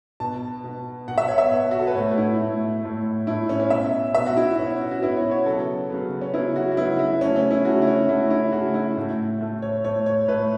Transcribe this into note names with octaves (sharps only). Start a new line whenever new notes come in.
B2 B3 A5
B2 B3
B2 B3 F#5
E5
C#5
E5
B2 B3
F#4
A4
B4
A2 A3 C#5
E4
A2 A3
A2 A3
A2 A3 E4
C#4
C#4
B2 B3 E5
B2 B3 E5
F#4
E4
B2 B3 C#4
F#4
B2 B3 E4
C#5
C#5
C#3 F#3 B3 A4
C#3 F#3 B3
C#4
C#3 F#3 B3 E4
F#4
F#4
C#3 F#3 B3 E4
E4
C#3 A3 C#4
C#4
E4
C#3 A3 F#4
E4
C#4
C#3 A3 E4
E4
C#3 A3 F#4
E4
A2 A3
A2 A3
C#5
A2 A3 C#5
C#5
A2 A3 B4